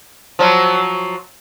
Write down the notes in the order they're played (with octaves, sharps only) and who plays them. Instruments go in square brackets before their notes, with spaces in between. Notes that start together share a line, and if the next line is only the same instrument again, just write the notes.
[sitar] F3 F#3